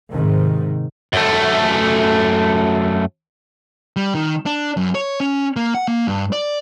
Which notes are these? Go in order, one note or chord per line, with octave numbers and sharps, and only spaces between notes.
G#2 C3 D#3
F#2 A3
G3
D#3
D4
F#2
C#5
C#4
A#3
F#5
A#3
G2
D5